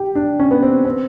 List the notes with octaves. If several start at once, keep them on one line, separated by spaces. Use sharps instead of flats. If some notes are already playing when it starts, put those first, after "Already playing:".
Already playing: G4
D4
C#4
B3
C4
C4